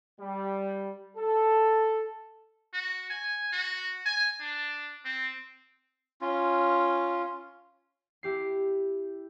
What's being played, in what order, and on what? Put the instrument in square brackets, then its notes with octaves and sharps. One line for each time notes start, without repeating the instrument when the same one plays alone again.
[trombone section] G3
A4
[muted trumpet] F#4
G#5
F#4
G#5
D4
C4
[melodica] C#4 F4
[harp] E4 G4 C7